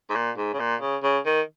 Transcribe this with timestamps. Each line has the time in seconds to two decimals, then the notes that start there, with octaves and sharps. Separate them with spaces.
0.10 G#2
0.15 A#2
0.37 G#2
0.53 C#3
0.60 A#2
0.81 C#3
1.03 C#3
1.25 D#3